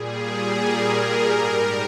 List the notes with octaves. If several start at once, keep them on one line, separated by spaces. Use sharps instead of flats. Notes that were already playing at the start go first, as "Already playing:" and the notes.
Already playing: A#2 G3 G#4
A#4
G#2 G3